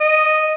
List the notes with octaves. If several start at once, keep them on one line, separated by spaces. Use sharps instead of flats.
D#5